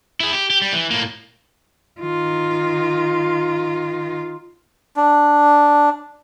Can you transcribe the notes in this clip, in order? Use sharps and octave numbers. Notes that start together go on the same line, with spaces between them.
E4 G#4
G4
G4
G3
E3
A2 A#3
D#3 F4
D4